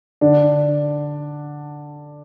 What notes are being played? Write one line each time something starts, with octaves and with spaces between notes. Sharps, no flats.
D3 D4